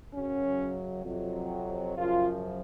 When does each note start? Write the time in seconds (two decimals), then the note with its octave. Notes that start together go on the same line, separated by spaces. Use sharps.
0.13 F#2 C#3 F#3 C#4
1.05 F2 C3 F#3
1.97 F#2 C#3 F3 F4